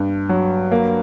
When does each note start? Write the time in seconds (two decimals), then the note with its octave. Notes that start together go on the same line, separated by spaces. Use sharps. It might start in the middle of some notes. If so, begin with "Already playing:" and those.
Already playing: G2
0.29 F#3
0.72 A#3